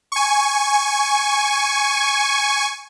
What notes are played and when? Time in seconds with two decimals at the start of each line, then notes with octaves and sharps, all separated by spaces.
0.12 G#5 C#6